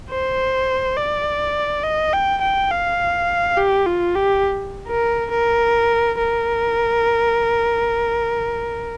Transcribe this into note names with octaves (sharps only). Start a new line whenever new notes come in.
C5
D5
D#5
G5
G5
F5
G4
F4
G4
A#4
A#4
A#4